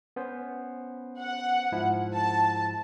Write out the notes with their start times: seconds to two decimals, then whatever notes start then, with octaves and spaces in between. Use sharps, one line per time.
0.16 B3 C#4 C5
1.18 F#5
1.72 G#2 F3 E4
2.14 A5